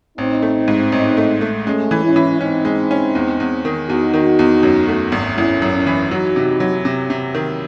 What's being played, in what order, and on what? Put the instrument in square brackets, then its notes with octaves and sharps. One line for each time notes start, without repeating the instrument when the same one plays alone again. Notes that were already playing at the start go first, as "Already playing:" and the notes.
[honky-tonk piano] A1 [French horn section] C4 D#4
[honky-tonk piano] A3
G#2
A1
A3
A3
[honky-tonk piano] G#3 [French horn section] A3 C#4
[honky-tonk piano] E3
[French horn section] C#4 E4
[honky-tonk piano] E3
[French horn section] C4 D#4 [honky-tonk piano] C#4
[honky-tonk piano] G#3
C#4
E2
E2
D#3
[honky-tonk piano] E2 [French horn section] D#4 F#4
[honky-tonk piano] D#3
E2
F#2
A3
G#1
[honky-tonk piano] G#1 [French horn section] C#4 E4
[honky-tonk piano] F#2
[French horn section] C#4 E4
[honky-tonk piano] E3
[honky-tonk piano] F#3 [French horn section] D#4 F#4
[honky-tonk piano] C3
F#3
C3
C3
D#3